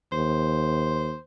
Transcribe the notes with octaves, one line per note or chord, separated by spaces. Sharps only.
D#2 C5